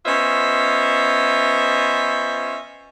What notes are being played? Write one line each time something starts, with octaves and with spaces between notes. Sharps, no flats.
B3 C#4 F4 C5 D#5 E5